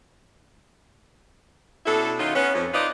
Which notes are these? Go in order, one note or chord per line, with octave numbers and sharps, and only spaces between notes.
B2 C#4 D4 E4 A4
D#3 F#3 C#4 D#4 F4
B3 C#4
F2
D#4 F4 B4 C5 D5 D#5